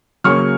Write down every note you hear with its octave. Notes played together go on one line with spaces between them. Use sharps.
C#3 F#3 A#3 C#4 C#6 F6